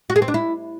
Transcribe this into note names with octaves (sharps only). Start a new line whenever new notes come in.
F#4
G#4
C4
D4
E4